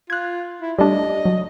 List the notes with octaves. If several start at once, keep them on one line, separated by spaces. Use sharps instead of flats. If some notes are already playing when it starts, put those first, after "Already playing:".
F4 F#6 G#6
E4
G3 A3 D4 D#5
F#3